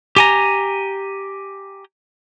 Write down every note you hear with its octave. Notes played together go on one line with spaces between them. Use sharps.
G4 G#5 A#5